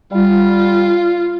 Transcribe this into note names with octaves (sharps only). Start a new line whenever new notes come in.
G3 F4